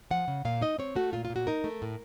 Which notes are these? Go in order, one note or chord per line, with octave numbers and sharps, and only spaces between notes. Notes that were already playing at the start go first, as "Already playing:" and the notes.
F3 F#5
C#3
A#2 F5
D#4 D#5
C4 C#5
A3 F#4
A#2 F4
F4
A#2
F#4
D#4 A#4
A3
A2